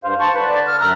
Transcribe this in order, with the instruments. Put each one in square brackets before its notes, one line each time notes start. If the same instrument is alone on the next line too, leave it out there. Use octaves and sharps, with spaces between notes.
[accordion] G2 C5 F5
[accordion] C5 C#6 [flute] A5
[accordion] D3 A5 [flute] B4
[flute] D5
F6
[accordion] F#2 E5 F#6 [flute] A#5